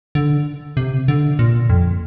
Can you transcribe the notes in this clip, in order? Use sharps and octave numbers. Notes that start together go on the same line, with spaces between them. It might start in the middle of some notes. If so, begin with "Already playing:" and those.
D3
C3
D3
A#2
F2